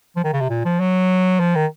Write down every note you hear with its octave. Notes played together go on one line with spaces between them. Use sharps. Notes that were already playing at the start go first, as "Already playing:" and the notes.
F3
D#3
C#3
C3
A#2
F3
F#3
F3
D#3